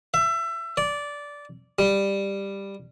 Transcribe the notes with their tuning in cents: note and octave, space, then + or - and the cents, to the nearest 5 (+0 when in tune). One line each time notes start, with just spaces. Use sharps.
E5 +25
D5 -15
G3 +10